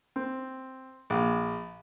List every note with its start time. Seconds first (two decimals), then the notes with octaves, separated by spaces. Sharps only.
0.16 C4
1.10 A#1